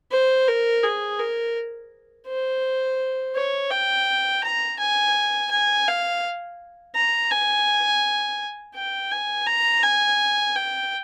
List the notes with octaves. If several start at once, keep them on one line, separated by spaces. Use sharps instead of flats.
C5
A#4
G#4
A#4
C5
C#5
G5
A#5
G#5
G#5
F5
A#5
G#5
G5
G#5
A#5
G#5
G5